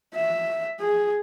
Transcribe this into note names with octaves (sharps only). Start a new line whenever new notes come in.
E5
G#4